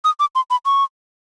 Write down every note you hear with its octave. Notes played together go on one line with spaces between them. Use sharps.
D#6
D6
C6
B5
C#6